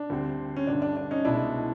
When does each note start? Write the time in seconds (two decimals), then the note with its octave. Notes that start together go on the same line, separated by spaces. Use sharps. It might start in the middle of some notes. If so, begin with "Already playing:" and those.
Already playing: D4
0.10 D2 D3 G3 C4
0.56 C#4
0.67 G1 G2 D3 D4
0.82 D4
0.96 D4
1.11 C#4 D#4
1.25 C2 B2 G#3 D4 E4